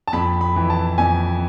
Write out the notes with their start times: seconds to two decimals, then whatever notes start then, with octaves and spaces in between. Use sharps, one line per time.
0.07 A5
0.13 F2 B5
0.41 B5
0.56 E3
0.70 A5
0.98 F2 G#5